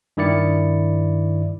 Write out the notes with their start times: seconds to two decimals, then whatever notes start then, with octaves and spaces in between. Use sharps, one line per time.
0.17 G2 D#3 E4 D5 C#7